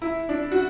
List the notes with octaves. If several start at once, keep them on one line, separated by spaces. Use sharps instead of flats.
E4
D4
F#4